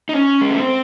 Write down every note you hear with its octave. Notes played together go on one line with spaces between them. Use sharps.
D#4
C#4
G#3
A3
C4